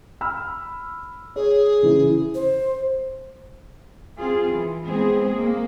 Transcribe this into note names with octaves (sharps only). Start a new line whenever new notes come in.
B5 E6 F6
G#4 C#5
C#3 E3 E4
C5
C4 F4 G#4
E3
G#3 B3 C4 G#4
A#3